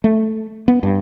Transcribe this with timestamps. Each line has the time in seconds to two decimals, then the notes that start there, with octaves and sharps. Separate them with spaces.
0.04 A3
0.68 B3
0.83 G2